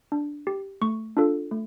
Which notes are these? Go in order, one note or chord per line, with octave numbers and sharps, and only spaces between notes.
D4
G4
A3 C#6
D4 F4 A4
A3